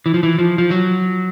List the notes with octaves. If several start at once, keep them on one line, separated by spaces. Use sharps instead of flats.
E3
F3
E3
F3
F3
F#3